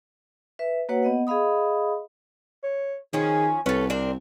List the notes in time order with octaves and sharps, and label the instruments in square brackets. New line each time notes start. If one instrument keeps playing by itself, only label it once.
[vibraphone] B4 E5
A#3 F#4 B4 C#5 F#5
B3 D#5 F#5
G#4 D#5 F5 B5 D#6
[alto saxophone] C#5
[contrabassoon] D#3 [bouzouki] F3 C#4 [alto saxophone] G#4
[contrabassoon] C2 [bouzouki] C#4 A4 [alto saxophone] B4
[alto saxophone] C4 [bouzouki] D4 A#4 C5